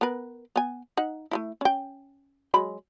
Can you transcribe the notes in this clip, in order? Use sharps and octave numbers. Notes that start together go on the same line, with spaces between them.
B3 A#4 B4
B3 G#5
D#4 F#5
A3 A#3 E4
C#4 G5
F#3 G#3 B5